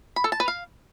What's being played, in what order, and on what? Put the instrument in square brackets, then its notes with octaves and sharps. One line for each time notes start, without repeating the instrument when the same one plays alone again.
[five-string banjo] B5
A4
A5
B4
F5